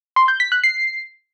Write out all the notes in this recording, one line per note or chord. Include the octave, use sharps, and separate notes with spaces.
C6
G6
B6
F#6
C7